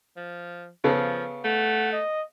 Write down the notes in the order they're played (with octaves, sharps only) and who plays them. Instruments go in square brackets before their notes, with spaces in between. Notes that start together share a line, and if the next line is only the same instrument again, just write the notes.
[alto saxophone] F3
[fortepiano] C#3 B3 A4 [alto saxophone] F3
[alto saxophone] A3 [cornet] F#5
[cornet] D#5